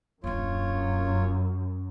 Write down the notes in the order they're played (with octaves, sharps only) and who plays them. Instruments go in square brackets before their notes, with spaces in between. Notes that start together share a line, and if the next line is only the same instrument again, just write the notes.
[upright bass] D#1 D4 [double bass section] F#2 [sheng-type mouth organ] F4 C#5